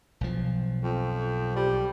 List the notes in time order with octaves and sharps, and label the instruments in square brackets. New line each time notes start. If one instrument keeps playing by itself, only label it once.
[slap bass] B1 F3
[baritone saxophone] F2
G3